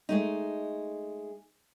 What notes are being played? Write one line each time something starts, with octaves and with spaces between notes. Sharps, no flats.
G#3 A3 D#4